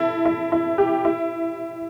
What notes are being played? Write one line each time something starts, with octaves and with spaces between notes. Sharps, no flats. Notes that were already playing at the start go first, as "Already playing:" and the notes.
Already playing: E4 A4
E4
E4
G4
E4